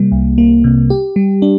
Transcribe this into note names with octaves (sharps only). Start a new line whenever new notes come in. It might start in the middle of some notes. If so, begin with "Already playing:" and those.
Already playing: C3 G3 A#3
C2
A#3
C3
G4
G3
D4